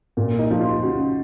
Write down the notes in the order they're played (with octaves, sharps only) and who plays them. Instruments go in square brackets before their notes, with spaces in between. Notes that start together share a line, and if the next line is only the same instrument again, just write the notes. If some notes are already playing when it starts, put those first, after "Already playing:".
[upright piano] A#2
[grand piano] D#4
[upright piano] F3
[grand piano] F4
[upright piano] C#3 [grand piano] F#4